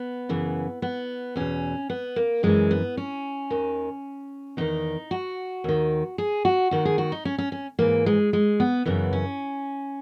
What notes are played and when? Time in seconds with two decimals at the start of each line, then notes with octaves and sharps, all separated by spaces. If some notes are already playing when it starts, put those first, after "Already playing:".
Already playing: B3
0.29 F#2 C#3 E3
0.82 B3
1.36 E2 B2 C#4
1.90 B3
2.16 A#3
2.43 F#2 E3 G#3
2.71 B3
2.97 C#4
3.50 D#2 D#3
4.57 E2 D#3 D#4
5.11 F#4
5.64 D#2 D#3
6.18 G#4
6.45 F#4
6.71 D#2 D#3 F#4
6.85 G#4
6.98 F#4
7.12 D#4
7.25 C#4
7.38 C#4
7.52 C#4
7.79 G#2 E3 A#3
8.06 G#3
8.33 G#3
8.60 B3
8.85 F#2 C#3 E3 B3
9.13 C#4